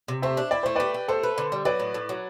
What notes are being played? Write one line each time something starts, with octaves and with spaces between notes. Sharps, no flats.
C3
A3 C5 E5
D4
E4 D5
A3 C5
G4 B4 D5
G4
A3 A4 C5
B4
D3
G3
F#3 B4 D5
A2
A2
F#3